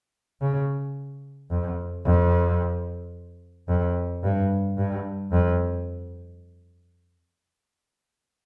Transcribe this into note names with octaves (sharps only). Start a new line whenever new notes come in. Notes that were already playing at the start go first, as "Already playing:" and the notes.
C#3
F2
F2
F2
G2
G2
F2